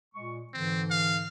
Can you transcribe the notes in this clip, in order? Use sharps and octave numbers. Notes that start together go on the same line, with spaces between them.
A#2 G#3 C#6
G#2 D3 E3 C4
F5